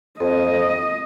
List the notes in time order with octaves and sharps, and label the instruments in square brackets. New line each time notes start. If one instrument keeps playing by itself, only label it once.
[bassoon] F2 [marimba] C4 A4 [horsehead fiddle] D#5